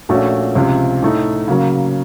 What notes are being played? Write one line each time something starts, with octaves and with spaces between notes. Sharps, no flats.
A#1 A#2 A3 C#4 F#4
C#2 C3 F3
A2 A3 D#4
C#3 F#3 A#3